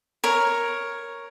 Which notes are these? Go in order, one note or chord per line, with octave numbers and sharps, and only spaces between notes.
A#4 C#5